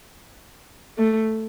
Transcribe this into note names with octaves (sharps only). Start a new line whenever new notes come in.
A3